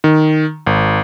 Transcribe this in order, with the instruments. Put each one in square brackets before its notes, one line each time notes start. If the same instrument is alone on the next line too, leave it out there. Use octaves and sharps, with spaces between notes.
[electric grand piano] D#3
G#1